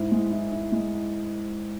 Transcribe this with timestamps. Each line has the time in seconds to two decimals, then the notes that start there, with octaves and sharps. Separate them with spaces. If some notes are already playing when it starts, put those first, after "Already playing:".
Already playing: G#2 E4
0.12 G#3
0.32 E4
0.52 E4
0.72 G#3